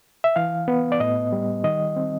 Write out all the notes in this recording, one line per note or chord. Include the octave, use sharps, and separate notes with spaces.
E5
E3 F5
B3
D5
A2 D#5
G3
D#3 D#5
C4